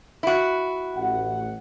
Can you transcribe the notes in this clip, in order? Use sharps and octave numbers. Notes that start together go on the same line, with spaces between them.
E4 F#4
A1 F#5